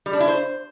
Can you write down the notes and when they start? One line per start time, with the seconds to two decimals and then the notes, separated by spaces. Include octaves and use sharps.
0.06 G3
0.13 D4
0.20 E4
0.28 C5